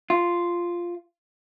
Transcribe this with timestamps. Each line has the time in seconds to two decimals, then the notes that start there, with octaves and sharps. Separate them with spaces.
0.10 F4